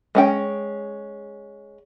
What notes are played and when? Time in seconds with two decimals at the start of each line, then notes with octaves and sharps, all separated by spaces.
0.15 G#3 C#4 G5